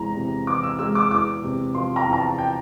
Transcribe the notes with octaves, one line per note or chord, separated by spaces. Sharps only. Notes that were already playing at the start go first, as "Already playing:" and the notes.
Already playing: E2 C3 E3 G#3 A#5
C3
E3 D6
E6
G#3 E6
D6
E2 D6
C3
F3 C6
A#5
E2
A#5
A5
G5